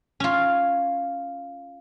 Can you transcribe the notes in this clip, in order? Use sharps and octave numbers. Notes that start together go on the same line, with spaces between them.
C#4 F4